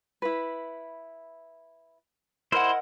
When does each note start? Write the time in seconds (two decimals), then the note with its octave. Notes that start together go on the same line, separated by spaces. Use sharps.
0.22 E4 B4
2.52 E4 A#4 C5 D#5 F#5